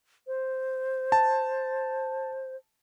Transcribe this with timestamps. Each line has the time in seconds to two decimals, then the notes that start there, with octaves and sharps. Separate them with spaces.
0.27 C5
1.12 A5